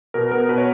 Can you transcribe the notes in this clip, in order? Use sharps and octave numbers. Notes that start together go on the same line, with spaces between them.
B2 A#4
B3 A#4
B2 B4
C#5